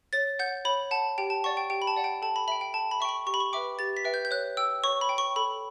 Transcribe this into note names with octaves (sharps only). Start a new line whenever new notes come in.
C#5 A6
F#5 G6
C#5 B5
F#5 A5
G4 G5
A5
D5 F#5 C#6
G5
G4 G5
B5
A5
D5 F#5
G5
A4 A5
B5
E5 G5 B5
G5
A4 A5
B5
E5 G5 B5 C#6
G4 C#6
B5
C#6
B4 E5 G5 D6
G4 A6
B6
B4 E5 G5
G6
G6
C#5 F#6
G5 E6
C#5 C#6
B5
G5
C#6
A4 B5